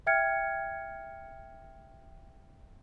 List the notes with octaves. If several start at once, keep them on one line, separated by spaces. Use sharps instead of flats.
E5 G5 F6 G#6 C#7